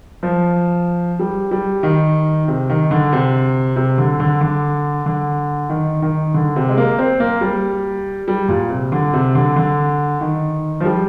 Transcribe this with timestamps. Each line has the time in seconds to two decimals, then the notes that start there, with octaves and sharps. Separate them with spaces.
0.23 F3
1.19 G3
1.51 G3
1.83 D#3
2.48 C3
2.70 D#3
2.91 D3
3.13 C3
3.76 C3
3.98 D3
4.20 D3
4.41 D3
5.06 D3
5.70 D#3
6.02 D#3
6.34 D3
6.56 C3
6.69 G#3
6.77 A#3
6.98 C4
7.20 A#3
7.41 G3
8.28 G3
8.48 A#2
8.70 C3
8.92 D3
9.13 C3
9.35 D3
9.56 D3
10.21 D#3
10.80 F3
10.85 G3